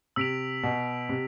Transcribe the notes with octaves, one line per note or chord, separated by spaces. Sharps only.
C3 E6 B6 D7 F7
B2
C3